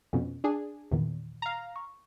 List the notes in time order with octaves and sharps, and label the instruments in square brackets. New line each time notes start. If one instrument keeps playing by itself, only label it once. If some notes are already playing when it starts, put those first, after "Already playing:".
[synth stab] F2 B2 [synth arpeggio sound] C#4
[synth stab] D4 G#4
[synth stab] E2 [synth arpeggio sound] A#2 D#3
[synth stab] F5 A#5
[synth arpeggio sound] C#6